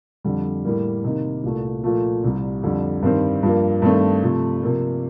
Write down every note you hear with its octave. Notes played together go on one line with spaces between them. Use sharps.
F2 D3 G3
A2 G3 A#3
C3 D#3 A#3 D#4
C2 A#2 A3
A#2 F3 A3
C2 C3 G3
F2 D3 G3
G2 D#3 G3 C4
G2 F3 A#3
G2 D#3 A3 C4
C3 F3 A3
C3 F3 A#3